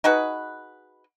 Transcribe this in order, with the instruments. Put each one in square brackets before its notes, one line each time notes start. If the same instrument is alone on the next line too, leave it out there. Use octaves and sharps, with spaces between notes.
[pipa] D#4 F#4 G#4 B4